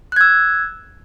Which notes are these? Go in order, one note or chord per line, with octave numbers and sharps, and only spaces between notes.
E6 F#6 G#6